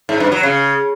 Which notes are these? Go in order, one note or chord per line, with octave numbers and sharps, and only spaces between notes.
G#2
G2
F#3
C#3